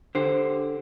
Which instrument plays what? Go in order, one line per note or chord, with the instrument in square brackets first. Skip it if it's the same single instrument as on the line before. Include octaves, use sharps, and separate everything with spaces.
[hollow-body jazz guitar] D3 G4 C5